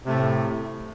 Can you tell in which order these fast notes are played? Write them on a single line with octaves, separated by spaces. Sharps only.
C3 A3 A2